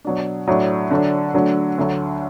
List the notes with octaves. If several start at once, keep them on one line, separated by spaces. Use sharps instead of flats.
B2 F#3 D4
A2 F#3 D4
D3 F#3 D4
D3 F#3 A3 D4
D2 D3 F#3